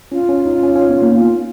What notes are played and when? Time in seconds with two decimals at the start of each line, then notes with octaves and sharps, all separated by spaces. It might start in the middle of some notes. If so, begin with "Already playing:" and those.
0.12 C#4 F4
0.29 C#4
0.46 D#4
0.63 C#4
0.76 C#4
0.89 B3
1.02 A#3
1.15 F4